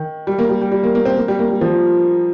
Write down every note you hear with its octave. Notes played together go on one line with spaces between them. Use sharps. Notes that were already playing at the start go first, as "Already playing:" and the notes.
Already playing: D#3
G3
A#3
G3
G3
G3
A#3
A#3
C4
A#3
G3
A#3
G3
F3